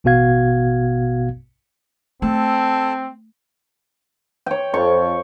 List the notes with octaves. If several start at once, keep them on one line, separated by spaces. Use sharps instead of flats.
A1 B2 B3 F#4 F5 G#6
A3 C4 A4 A5
C#5 G5
F2 C#6